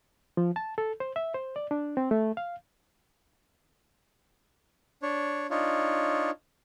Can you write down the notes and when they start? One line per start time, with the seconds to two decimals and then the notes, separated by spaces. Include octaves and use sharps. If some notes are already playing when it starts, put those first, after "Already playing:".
0.37 F3
0.56 A5
0.78 A4
1.00 C5
1.16 E5
1.35 C5
1.56 D5
1.71 D4
1.97 C4
2.11 A3
2.37 F5
5.02 D4 C#5
5.50 D4 D#4 F4 C#5